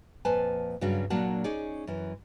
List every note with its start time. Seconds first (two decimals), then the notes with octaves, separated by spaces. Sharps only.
0.25 F2 A#2 F3 B4 G#5 A5
0.81 G2 C#3 F#3 D4 F#4
1.10 A#2 F#3 A#3 D4 F#5 A5
1.44 C#4 D#4 G#4 D5
1.87 F#2 E3